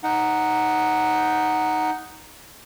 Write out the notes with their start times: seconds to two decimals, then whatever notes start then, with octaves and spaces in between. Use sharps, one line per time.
0.04 D#4 F#5